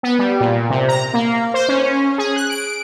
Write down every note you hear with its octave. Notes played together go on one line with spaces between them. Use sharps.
B3
G3
A#2
C3
A#5
A#3
C5
C#4
G#4
F#6
D7